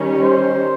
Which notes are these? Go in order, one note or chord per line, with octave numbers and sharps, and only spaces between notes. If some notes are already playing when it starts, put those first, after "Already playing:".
Already playing: D#3 G3 C#4
C5